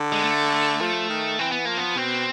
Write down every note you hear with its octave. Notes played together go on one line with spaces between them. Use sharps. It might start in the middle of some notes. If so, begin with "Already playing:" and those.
Already playing: D3
G#3
A3
F3
D#3
E3 C4
B3
F3 A#3
B3
B2 C4